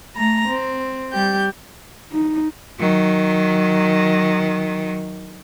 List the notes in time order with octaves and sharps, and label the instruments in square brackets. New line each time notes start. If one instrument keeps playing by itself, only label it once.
[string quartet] A3 A#5
C4
G3 G4 G6
[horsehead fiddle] D#4
[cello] D#3 F#3